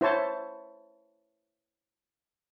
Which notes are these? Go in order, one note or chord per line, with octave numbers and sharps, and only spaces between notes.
E4 C5 C#5 A5